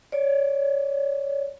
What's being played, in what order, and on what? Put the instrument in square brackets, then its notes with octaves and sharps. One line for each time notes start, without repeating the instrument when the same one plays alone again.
[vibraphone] C#5 D5